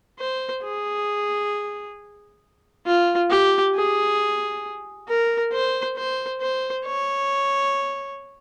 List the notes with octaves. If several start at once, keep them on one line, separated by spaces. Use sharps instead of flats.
C5
G#4
F4
G4
G#4
A#4
C5
C5
C5
C#5